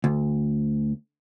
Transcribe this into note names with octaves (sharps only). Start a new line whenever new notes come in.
D2